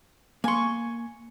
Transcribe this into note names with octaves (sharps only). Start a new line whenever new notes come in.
A#3 G#5 C6 C#6